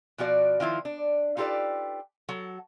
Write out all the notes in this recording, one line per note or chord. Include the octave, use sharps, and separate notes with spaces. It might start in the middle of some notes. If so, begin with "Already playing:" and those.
B2 F3 F#4 D5
D#3 F3 E4 F4
D4
D#4 F4 G4 A4 B4 D5
F#3 A4